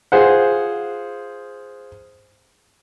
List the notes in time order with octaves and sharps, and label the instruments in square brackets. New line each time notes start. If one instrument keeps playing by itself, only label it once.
[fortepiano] F4 G#4 C5 F#5